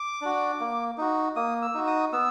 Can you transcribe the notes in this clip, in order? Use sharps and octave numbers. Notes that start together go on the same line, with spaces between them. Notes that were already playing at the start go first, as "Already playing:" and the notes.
Already playing: D6
D4 F#4
A#3
D#4 F#4
A#3 D#6
E6
D#4 F#4
D#6
B3 E6